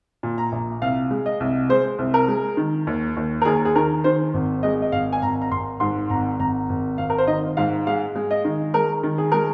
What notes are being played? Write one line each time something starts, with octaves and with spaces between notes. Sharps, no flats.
A#2
A#5
A#1
C2 F5
G#3
D#5
C2
G#3 C5
C2
A#4
G#3
D#3
D#2
D#2
A#4
D#2 G#4
G#4
D#3 A#4
D#3 C5
G#1
G#3 D#5
D#5
G#1 F5
G#5
G#1 A#5
A#5
G#1 C6
G#2 C6
G#1 A#5
G#1 A#5
G#1
G#1 F5
A#4
C5
D#3 D#5
G#2 F5
G#3 F5
G#3
D#5
D#3
G#3 A#4
D#3
G#4
G#3 A#4